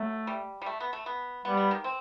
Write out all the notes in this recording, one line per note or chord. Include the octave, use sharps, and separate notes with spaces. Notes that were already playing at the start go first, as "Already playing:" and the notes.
Already playing: F#3 A3
G3
G3
A3
B3
A3
B3
G3 B3
B3
D#3
C4